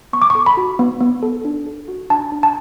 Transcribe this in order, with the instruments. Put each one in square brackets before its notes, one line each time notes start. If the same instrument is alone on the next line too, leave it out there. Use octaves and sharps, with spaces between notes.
[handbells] B3 C#6
D6
A4 C#6
B5
F#4
B3
B3
A4
D4
A4
F#4
D4 A5
D4
A5